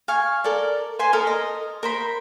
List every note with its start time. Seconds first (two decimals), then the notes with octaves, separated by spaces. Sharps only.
0.08 F5 G#5 C#6
0.44 A4 A#4 D5
0.99 B4 C5 G#5 C6
1.13 A4 A#4 D#5
1.27 D#5
1.83 A#4 C5 B5